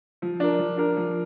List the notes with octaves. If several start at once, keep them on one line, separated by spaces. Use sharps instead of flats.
F3
D4 A#4
F3
D4 A#4
F3